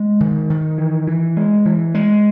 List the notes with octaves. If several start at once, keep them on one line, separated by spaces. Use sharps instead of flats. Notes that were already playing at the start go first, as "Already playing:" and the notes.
Already playing: G#3
D#3
D#3
E3
E3
G#3
E3
G#3